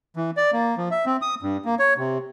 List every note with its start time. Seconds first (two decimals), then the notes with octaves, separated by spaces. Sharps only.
0.16 E3
0.37 D5
0.53 A#3
0.78 F3
0.91 E5
1.06 C4
1.22 D#6
1.42 G2
1.65 A#3
1.79 C#5
1.98 C3